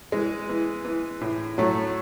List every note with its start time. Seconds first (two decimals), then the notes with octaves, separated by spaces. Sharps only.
0.12 E3 G#3
0.49 E3
0.85 E3
1.21 A2
1.58 A2 F#3 A3